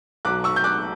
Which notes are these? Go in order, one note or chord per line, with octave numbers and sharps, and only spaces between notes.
B1 B2 F#3 D6 F#6
C#6 E6
G6
D6 F#6